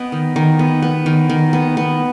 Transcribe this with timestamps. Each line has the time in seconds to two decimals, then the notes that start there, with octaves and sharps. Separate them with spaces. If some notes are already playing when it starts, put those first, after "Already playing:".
Already playing: B3 D#5 G5
0.12 D#3
0.36 D#3
0.59 B3
0.82 B3
1.06 D#3
1.30 D#3
1.53 B3
1.77 B3